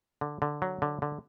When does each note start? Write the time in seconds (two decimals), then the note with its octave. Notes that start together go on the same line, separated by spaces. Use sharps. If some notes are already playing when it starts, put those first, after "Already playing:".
0.21 D3
0.42 D3
0.62 F#3
0.82 D3
1.02 D3